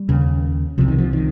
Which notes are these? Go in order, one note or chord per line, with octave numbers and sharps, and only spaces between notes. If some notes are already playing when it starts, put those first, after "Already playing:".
Already playing: G3
D#2 C#3
C2 C3 F3
D#3
F3
D#3